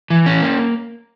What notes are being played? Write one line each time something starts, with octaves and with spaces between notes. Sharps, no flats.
E3
C#4
A#3